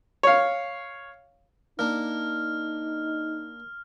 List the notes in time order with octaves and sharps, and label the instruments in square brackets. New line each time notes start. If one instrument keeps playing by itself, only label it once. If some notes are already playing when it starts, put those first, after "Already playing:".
[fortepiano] C#5 F5
[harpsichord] A#3 D4 [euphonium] D#4 [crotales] F6